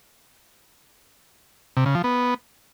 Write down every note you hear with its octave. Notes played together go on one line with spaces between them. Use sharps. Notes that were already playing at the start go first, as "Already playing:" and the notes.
C3
C#3
F3
B3